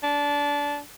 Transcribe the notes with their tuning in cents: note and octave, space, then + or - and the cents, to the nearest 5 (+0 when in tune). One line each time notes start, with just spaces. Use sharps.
D4 -20